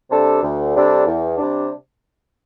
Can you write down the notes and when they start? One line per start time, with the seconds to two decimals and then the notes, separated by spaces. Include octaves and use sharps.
0.10 C3 G3 D4 A4
0.42 D2
0.74 C3 G3 D4 A4
1.06 E2
1.38 C3 G3 D4